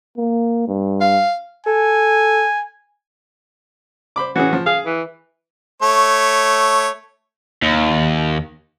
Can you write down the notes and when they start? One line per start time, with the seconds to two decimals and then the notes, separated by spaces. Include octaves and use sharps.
0.17 A#3
0.68 G2
1.01 F5
1.66 A4 G#5
4.16 C5 B5 D6
4.36 E3 C#4 F#4 G#4
4.53 F3
4.66 G#4 F5
4.86 E3
5.82 A3 C#5
7.62 D#2